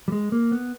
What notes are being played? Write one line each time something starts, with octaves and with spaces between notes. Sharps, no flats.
G3
G#3
A#3
B3